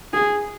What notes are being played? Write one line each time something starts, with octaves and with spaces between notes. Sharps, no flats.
G#4